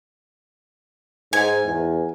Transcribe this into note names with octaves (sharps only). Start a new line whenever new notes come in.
G#2 G#5
E2